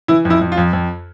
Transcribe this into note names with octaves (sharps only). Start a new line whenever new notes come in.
E3 E4
F2
E4
F2
F4
F2
F2